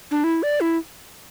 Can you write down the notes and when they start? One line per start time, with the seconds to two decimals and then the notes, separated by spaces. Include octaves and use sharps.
0.11 D4
0.24 E4
0.43 D5
0.61 E4